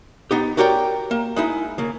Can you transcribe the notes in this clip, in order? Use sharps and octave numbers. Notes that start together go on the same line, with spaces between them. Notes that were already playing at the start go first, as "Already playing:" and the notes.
B3 D#4 G4
F#4 G4 A#4 C#5 D5 G5
A#3
G#3 D#4 E4
C#3 A#3